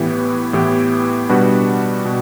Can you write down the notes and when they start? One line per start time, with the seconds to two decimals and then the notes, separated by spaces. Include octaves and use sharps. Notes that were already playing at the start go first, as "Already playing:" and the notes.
Already playing: A2 E3 B3 E4 G4
0.53 A2 E3 B3 E4 G4
1.29 B2 G3 D4 F#4 B4
2.05 B2